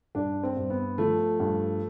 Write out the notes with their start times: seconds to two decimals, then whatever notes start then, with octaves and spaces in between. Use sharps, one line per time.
0.15 G2 D4
0.43 C4
0.57 G2
0.70 B3
0.98 F3 A3
1.40 G2